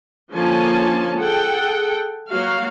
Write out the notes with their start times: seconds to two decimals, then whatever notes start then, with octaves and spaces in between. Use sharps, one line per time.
0.33 D3 F3 A#3 C#4 G#5 A5
1.18 G#4 A4 F#5 G5
2.30 F#3 A#3 F#4 F5